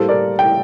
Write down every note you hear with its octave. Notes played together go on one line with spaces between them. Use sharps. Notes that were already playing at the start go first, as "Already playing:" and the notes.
Already playing: A2 G3 A#3 A4 C5
A#4 D5
G5